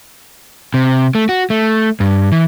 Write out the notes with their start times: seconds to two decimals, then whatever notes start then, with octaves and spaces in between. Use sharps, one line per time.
0.74 C3
1.15 A3
1.29 F#4
1.50 A3
2.00 G2
2.32 E3